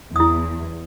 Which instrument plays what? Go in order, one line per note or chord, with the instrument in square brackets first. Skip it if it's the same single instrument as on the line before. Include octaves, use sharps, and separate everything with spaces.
[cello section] E2 [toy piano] E4 D#6